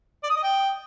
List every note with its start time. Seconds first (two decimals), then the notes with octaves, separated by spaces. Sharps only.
0.23 D5
0.30 D#6
0.36 D#5
0.43 G5